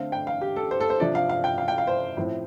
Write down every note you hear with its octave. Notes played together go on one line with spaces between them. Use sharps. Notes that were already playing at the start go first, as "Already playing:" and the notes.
Already playing: D3 A3 C4 F5
G5
F5
G4
A4
C5
A4
C5
C3 F3 D4 D5
F5
F5
G5
F5
G5
F5
C5
A2 F3 C4